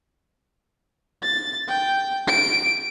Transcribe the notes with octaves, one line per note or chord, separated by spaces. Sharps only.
A6
G5
D7